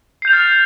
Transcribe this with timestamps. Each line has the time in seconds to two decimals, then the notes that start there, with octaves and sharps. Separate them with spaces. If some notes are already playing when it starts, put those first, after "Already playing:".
0.22 C7
0.25 G6
0.28 F7
0.30 A6
0.33 F6